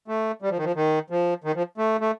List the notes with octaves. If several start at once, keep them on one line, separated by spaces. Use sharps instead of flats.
A3
G3
F3
D#3
F3
D#3
F3
D#3
F3
A3
A3